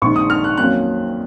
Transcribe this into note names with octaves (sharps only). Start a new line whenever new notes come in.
A#1 G#2 D#3 C#6
D#6
F6
F#6
F2 D#3 F#3 A#3 C#4 F#6